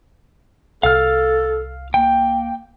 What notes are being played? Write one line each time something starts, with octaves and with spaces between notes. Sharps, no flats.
C2 A4 F5 F6
A#3 G5